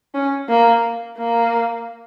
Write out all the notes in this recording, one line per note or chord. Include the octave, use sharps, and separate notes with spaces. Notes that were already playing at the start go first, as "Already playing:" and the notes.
C#4
A#3
A#3